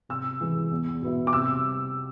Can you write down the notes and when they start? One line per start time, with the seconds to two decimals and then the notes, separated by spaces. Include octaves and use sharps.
0.09 C3 E6
0.40 E3 G#3
0.71 E2
1.02 B2 B3 E4
1.27 D6
1.32 C3 E6